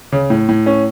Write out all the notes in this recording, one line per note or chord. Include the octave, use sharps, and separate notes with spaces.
C#3
A2
A2
C#4